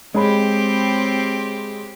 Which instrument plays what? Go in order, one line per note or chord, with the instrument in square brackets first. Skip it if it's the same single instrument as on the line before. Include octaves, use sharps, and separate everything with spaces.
[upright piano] G#3 C#5 B5 [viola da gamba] C4 G4